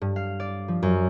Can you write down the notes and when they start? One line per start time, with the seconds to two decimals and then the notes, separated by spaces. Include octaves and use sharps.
0.02 G2
0.16 F5
0.40 D5
0.68 F3
0.83 F#2